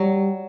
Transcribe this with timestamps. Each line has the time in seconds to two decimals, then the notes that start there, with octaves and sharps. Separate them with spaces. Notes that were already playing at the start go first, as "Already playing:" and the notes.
Already playing: F#3 G3